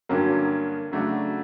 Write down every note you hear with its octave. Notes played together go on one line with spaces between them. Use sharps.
G2 D3 F#3 A#3 C#4
C#3 F#3 A3 D4 F#4